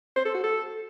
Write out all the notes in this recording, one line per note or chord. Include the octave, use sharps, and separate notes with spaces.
C5
A4
F#4
A4